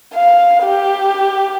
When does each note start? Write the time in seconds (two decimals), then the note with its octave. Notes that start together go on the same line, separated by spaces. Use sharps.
0.14 F5
0.64 G4